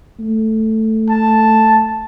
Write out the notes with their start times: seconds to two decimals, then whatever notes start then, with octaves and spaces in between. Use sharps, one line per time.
0.19 A3
1.10 A5